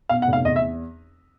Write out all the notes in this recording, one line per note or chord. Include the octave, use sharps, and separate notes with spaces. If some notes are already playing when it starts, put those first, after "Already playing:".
B2 F5
F#5
F1
F5
E2 D#5
E5